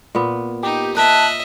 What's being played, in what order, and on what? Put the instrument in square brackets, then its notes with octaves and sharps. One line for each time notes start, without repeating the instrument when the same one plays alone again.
[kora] A#2 B3
[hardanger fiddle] D#4 [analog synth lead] G4
[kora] A#4 [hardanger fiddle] D#5 E5 [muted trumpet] A5 [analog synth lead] F#6